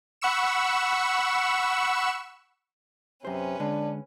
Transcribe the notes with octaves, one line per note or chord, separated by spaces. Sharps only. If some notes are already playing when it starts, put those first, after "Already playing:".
F#5 B5 C#6 E6 C#7 E7
F#2 C3 C#4 B4 C5
D3 G#3 D4